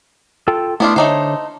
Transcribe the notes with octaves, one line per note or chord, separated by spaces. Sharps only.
F4 A4 G5
A3 B3 D4 E4 F4
D3 A3 D#4 C5 C#5